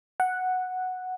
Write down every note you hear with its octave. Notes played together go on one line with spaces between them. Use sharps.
F#5